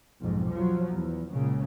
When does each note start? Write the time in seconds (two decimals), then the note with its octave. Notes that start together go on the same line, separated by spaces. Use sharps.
0.20 B1 F2 G#2
0.50 F3 F#3
0.92 E2
1.32 C#2 A#2 C#3